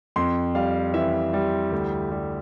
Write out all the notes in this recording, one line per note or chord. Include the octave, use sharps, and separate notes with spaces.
F2 C6
G3 F5
E3 E5
G3
D2
G3